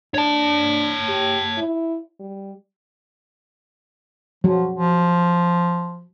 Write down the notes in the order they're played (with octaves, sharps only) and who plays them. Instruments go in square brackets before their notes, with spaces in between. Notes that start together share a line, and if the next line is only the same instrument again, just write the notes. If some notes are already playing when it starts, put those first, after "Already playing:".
[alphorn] D4 [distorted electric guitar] C#5 A5
[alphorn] G4
E4
G3
[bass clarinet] F3 [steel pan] F#3
[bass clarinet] F3